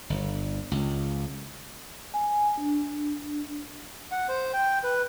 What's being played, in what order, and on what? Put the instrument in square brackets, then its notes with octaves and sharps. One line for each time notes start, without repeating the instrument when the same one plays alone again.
[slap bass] G1
C#2
[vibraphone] G#5
D4
[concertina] F#5
C5
G5
B4